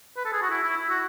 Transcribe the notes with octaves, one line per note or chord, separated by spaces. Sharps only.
B4
A4
G#4
F#4
E4
E4
E4
F#4